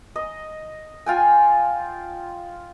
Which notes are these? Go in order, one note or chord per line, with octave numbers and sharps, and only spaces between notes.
D#5
F4 G5 G#5